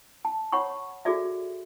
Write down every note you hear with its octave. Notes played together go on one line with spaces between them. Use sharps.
A5
C#5 F#5 B5 C#6
F#4 G#4 A4 D5 E5